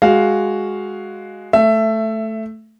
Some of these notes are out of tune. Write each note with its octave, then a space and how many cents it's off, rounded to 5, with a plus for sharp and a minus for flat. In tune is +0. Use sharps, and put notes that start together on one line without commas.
G#3 +0 F#4 +0 F5 +0
A3 +0 E5 +15